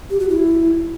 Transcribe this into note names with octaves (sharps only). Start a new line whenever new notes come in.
G4
F#4
E4